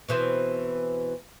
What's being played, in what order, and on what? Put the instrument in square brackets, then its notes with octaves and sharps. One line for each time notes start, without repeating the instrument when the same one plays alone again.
[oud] B2 E3 C4